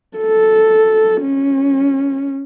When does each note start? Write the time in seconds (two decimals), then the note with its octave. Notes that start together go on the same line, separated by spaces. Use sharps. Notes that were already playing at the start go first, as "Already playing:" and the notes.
0.17 A4
1.21 C#4